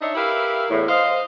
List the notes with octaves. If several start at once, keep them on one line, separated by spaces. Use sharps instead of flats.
D4 D#4 C#5 D#5 E5
E4 G4 A#4 B4 E5 F5
E2 A2
C5 D#5 F5